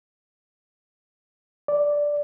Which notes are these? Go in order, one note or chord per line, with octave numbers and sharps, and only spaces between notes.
D5